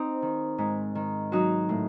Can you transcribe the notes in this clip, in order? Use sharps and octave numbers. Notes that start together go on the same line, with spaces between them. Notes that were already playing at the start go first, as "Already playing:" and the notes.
Already playing: C4 D#4
D#3
G#2
D#3
F#3 D#4 F#4
A2